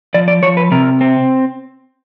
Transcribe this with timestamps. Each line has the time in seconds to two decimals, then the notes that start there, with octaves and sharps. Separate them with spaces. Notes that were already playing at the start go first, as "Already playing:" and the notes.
0.14 F3 D5
0.28 D5
0.43 F3 C#5
0.57 B4
0.72 C3 A#4
1.01 C4